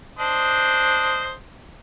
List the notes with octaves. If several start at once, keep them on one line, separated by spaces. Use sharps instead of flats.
D4 C5 D#5